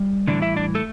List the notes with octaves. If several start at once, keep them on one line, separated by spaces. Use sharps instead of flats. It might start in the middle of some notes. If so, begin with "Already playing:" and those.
Already playing: G3
A2 D3 E3 G3 D4
E4 E5
D4 D5
A3 A4